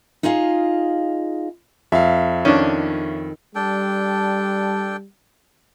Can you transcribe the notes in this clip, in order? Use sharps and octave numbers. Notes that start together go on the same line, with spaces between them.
D#4 F4 G#4 D#5 F5
F2 E5 F5
D#3 C#4 D4
G3 D4 A4 G5